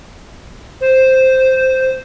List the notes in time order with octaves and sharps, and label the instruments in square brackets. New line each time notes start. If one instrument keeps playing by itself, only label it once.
[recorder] C5